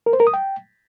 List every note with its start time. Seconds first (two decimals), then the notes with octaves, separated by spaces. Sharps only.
0.06 A#4
0.13 C5
0.20 A#4
0.27 D#6
0.34 G5